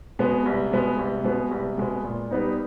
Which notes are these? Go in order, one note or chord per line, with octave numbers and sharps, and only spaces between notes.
B2 G#3 B3
C2
B2 G#3 B3
C2
B2 G#3 B3
C2
B2 G#3 B3
A#2
G3 B3 D#4